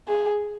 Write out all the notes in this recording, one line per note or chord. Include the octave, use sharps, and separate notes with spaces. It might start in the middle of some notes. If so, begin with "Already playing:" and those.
G#4